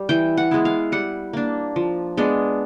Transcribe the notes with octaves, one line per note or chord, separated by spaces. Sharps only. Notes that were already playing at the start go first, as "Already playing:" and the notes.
Already playing: G3
E3 G5
F#5
G#3 B3 E4
F5
G3 F#5
A#3 D4
F3
G#3 B3 D4